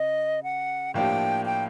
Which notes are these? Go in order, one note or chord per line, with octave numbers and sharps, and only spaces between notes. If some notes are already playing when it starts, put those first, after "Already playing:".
Already playing: C#3 D#5
F#5
A2 F3 A#3 D4 G4 G5
G5